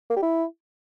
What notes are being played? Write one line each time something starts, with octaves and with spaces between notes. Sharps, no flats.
A#3
G4
E4